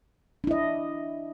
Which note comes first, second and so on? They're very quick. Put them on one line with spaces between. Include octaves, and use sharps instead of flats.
D4 E4 D#5